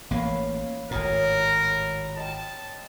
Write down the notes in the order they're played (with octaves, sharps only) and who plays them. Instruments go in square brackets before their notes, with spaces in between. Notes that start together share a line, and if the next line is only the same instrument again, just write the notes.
[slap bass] A1 A#3 [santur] B4 C#5 F5
[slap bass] G#1 A2 [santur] F#3 F#5 D#6 [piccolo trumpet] A#4
[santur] D#5 G5 [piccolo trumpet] A5